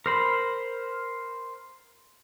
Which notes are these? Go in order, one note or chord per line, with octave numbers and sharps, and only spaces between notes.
A#4 C5 B5